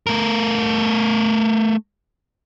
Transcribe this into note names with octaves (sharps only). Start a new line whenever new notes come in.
A3 A#4